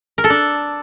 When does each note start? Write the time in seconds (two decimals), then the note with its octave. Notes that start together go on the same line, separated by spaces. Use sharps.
0.18 A#4
0.24 A4
0.30 D4